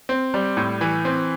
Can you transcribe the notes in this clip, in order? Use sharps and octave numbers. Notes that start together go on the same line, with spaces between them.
C4
G3
A2
E3
C4